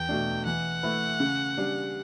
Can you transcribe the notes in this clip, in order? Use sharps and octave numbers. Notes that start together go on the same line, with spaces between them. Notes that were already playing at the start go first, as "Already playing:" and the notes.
Already playing: E2 G5
B2 A3 D4
E3 F#5
A3 E4 B4
C#3
G3 D4